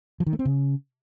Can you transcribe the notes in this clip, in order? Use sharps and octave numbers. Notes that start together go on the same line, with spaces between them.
F3
D#3
A3
C4
C#3